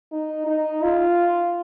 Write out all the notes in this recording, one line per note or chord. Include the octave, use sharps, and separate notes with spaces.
D#4
D#4
F4